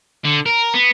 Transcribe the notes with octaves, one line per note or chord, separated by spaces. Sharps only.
D3
A#4
B3